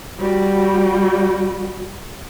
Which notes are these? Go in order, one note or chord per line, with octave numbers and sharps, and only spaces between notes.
G3 F#4